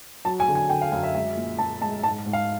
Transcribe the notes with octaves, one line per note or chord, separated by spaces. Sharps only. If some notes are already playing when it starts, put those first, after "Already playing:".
F#3 A5
G#5
D3
G#5
D3 G5
F5
F#2 F5
E5
G#3 E5
A#2
A#2 A5
G#3 A5
G#2 A5
G#2
F5